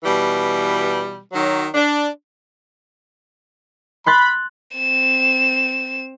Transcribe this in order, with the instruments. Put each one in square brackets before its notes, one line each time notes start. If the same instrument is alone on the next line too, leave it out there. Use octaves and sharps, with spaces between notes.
[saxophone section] B2 E3 G3
D#3 F#3
D4
[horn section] B5 [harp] C6 F#6 A6
[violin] C4 E7